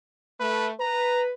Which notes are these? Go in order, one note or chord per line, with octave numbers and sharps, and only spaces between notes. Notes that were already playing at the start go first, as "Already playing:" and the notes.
A3 B4
B4 A#5